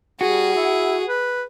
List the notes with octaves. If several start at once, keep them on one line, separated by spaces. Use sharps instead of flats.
G3 F#4 G#4
E4
B4